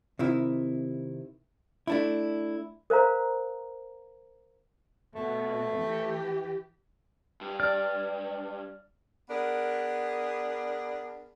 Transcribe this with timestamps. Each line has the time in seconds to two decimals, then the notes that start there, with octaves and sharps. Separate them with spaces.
0.19 C3 D#3 E4
1.87 A3 D4 E4
2.90 A#4 C5 F5 A#5
5.15 B2 A3
5.78 E3 G4
7.41 G2
7.60 D5 F6
9.30 B3 D4 G#4 A#4